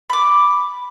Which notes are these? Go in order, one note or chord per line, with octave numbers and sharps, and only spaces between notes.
B5 D6